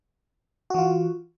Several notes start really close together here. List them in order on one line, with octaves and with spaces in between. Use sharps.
F#4 E3 F4